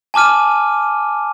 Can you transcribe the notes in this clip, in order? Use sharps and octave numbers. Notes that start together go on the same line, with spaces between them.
G#5 A5 D6 F6 D#7